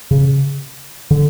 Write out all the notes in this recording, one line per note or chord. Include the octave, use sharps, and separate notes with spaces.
C#3
D3